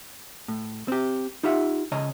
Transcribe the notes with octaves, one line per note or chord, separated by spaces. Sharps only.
A2
C4 G4
D#4 F4 G4 E5 F#5
C#3 C#5 D#5 A#5